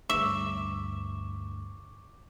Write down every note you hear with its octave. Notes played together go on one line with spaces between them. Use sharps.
D2 G2 E5 C#6 D6